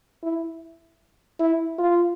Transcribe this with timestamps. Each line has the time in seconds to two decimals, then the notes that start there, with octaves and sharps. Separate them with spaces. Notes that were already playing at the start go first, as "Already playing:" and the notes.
0.23 E4
1.40 E4
1.78 F4